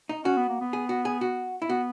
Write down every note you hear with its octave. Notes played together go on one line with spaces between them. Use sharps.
D#4
C#4 F#4
B3
A#3
B3
G#4
F#4
G#4
F#4
E4
B3 F#4